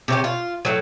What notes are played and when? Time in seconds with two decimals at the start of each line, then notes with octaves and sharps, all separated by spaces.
0.08 C3 C#4 G4
0.24 F4
0.65 A2 F#3